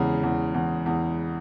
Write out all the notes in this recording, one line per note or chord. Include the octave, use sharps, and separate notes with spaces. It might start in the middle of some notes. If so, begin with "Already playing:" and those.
Already playing: E2 C#3 G#3
E2
E2
E2